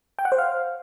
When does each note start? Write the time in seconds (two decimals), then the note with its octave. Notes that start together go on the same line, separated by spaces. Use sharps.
0.19 G5
0.25 F#5
0.32 C5
0.38 F5